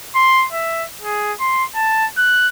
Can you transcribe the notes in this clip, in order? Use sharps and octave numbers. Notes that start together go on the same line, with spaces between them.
C6
E5
G#4
C6
A5
F#6